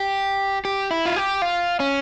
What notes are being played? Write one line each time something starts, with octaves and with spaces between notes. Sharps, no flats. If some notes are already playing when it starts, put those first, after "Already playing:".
Already playing: G4
G4
E4
F4
G4
F4
C#4